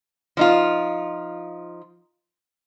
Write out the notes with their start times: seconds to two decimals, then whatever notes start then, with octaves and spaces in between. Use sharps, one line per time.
0.37 F3 D#4 F4